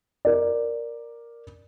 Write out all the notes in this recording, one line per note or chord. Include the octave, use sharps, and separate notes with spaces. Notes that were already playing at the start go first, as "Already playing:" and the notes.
A#4 D5